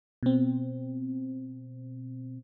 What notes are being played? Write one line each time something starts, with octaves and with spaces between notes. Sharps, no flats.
B2 C4